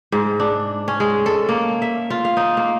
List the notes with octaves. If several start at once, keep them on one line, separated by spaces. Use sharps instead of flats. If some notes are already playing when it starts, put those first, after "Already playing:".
G#2
D4
C#4
G#3
A4
A#3
E5
F4
F5
D#4
A#3